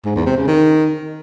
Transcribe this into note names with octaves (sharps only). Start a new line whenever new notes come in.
G#2
E2
C3
C#3
D#3